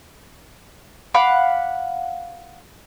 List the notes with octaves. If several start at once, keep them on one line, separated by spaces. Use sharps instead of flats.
F5 F#5 B5 D6